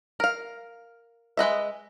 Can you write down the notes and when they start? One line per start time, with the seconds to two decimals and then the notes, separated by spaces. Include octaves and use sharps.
0.20 A#4 F5
1.37 G#3 B4 D#5 E5